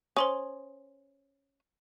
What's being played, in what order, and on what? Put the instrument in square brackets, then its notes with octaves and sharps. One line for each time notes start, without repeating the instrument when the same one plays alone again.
[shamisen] C#4 [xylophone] C5 C6 D#6